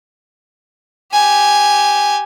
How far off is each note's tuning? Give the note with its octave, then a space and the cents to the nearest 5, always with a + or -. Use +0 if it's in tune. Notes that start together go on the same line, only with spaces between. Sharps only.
G4 +0 G#5 +0